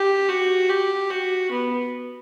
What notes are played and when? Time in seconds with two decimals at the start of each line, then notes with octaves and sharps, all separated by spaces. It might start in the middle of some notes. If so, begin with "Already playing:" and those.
Already playing: G4
0.29 F#4
0.69 G4
1.10 F#4
1.52 B3